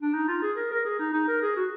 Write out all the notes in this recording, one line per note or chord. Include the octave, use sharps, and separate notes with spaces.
D4
D#4
F4
G#4
A#4
A#4
G#4
D#4
D#4
A#4
G#4
F#4